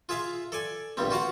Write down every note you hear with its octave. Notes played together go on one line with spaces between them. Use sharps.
F4 G#4 E5 F5
A4 D5 G#5
A#1 G2 G3 C4
F4 F#4 F5 F#5